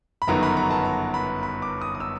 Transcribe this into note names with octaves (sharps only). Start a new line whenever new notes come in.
B5
G1 F#2 D#3 F#3 B3 A#5
B5
A#5
A5
A#5
B5
B5
D6
D#6
D#6
E6